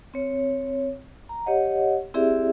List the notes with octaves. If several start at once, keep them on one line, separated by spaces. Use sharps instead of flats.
C4 C#5
A#5
G4 C#5 D#5 F#5
C4 E4 G4 G#4 D5 E5